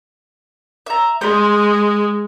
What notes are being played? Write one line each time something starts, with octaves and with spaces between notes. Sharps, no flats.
E5 A#5
G#3 C5